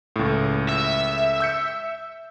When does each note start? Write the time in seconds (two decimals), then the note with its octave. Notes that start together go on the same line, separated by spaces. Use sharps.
0.16 C#2 A2
0.69 E5
1.40 E6 G6 C#7